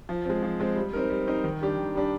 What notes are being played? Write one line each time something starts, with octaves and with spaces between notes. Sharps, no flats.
F3
G#3 C4
F3
G#3 C4
G3
C4 D#4 A#4
G3
C4 D#4 A#4
D#3
G3 D4 G4
D#3
G3 D4 G4